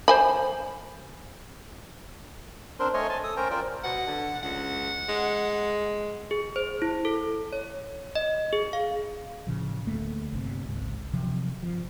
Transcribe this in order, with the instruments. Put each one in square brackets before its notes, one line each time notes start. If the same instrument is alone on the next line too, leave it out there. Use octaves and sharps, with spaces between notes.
[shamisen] C5 G#5 B5
[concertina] C4 D4 A#4 C5 C6
A3 C#5 D#5 G#5 C6
G#5 A5 C6
A4 D#6
C#4 A#4 C5 G5 A#5
F4 A#4 C5 D5 G5
[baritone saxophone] B2 [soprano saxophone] F#5
[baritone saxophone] D3
[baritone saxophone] C#2 [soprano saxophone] F#5
[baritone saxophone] G#3
[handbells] G#4
C5
E4
A4
C#5
D#5
G#4
F5
[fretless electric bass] A2 C#3 F3
D2 A3 A#3
G1 C3
G#1 C#2 G#2
C3 F3 F#3
G1 F3